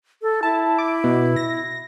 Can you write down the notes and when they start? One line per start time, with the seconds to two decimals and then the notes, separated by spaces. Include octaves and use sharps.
0.22 A4
0.43 E4 A5
0.79 D6
1.04 B2
1.36 A#6